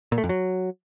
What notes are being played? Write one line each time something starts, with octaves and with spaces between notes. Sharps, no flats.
A#2
A3
F2
F#3